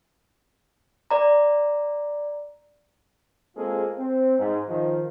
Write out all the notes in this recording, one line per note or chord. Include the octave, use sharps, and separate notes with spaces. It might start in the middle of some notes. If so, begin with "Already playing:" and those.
D5 A#5
G#3 A#3 C4 F4 G#4 A4
C4
G#2
D#3 F3